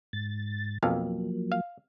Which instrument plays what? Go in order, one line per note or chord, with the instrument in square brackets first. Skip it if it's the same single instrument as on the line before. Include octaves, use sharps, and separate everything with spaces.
[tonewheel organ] G#2 A6
[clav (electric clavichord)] B1 F2 F5 [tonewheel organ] F3 F#3 A#3
[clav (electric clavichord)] F5